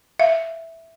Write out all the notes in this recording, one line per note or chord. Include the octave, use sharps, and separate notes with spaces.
E5 F5